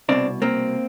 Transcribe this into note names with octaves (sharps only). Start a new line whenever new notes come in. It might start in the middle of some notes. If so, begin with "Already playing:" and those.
C2 B2 C4 D4
A#3 C4